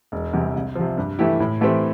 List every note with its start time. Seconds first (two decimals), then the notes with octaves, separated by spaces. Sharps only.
0.12 E1
0.33 E2 C3 G3
0.55 C2
0.75 C3 F3
0.98 G2
1.19 E3 A3 E4 G4
1.40 A2
1.61 E3 A3 C4 G4